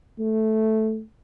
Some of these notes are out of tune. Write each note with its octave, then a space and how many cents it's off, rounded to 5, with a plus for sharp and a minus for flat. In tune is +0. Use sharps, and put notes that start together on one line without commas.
A3 -5